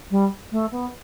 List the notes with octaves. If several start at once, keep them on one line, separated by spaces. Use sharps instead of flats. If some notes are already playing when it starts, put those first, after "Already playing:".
G3
A3
B3